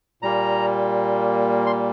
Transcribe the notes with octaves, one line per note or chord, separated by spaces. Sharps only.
A#2 G3 A#3 A#5
C6